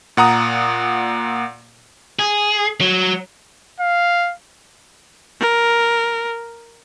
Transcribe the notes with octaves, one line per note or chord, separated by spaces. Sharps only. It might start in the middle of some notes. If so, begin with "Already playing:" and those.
A#2 F#5 A#5 D#6
G#4
F#3
F5
A#4